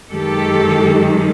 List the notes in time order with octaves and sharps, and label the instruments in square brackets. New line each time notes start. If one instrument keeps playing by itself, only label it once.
[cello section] F#2 D#3 G#3 G4 A4